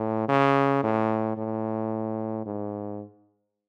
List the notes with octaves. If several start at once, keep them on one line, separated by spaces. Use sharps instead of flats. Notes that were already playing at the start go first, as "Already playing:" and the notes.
Already playing: A2
C#3
A2
A2
G#2